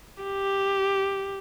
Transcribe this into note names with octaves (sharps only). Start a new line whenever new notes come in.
G4